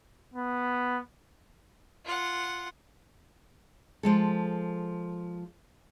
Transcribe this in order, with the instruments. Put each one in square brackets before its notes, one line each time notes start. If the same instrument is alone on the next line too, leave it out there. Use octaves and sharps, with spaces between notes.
[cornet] B3
[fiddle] F4 F#5
[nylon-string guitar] F3 G#3 A4